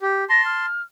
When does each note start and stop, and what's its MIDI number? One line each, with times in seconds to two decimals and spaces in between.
0.01 0.24 67
0.29 0.66 81
0.29 0.66 84
0.29 0.43 94
0.45 0.82 89